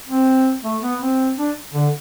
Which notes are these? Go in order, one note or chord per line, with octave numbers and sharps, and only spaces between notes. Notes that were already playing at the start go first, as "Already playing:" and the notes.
C4
A3
B3
C4
D4
D3